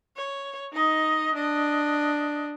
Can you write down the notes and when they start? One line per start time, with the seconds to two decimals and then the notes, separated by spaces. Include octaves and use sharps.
0.17 C#5
0.73 D#4 D#5
1.34 D4 D#5